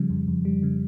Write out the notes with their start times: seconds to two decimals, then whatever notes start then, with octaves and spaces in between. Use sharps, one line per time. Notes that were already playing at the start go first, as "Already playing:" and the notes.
Already playing: C#3 F3 G3
0.10 F2
0.28 F2
0.45 G3
0.63 C#3